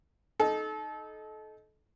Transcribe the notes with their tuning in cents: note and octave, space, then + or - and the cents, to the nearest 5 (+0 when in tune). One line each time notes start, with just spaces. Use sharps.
D#4 +0 A4 -30